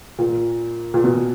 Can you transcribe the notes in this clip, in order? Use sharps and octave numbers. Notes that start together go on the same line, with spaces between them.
A#2
A#2
B2